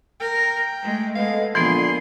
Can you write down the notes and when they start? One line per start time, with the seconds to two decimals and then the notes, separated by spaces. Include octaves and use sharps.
0.20 A#4 G5
0.82 G#3 A3
1.15 G#3 B3 A4 D#5 F5
1.55 A#2 D3 E3 F3 B3 G#4 C6